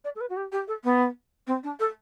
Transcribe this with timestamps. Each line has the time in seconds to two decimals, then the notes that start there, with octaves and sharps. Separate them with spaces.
0.04 D5
0.16 A4
0.21 B4
0.30 F#4
0.37 G4
0.52 G4
0.68 A4
0.84 B3
1.47 C4
1.63 D4
1.80 A4